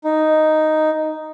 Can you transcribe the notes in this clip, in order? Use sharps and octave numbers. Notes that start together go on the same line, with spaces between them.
D#4